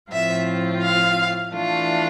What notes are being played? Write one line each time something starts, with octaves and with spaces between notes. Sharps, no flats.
A2 F3 C4 F4 E5
F5
E3 A3 D4 F4